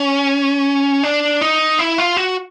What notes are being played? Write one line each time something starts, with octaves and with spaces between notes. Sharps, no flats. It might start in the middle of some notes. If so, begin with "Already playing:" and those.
Already playing: C#4
D4
D#4
E4
F4
F#4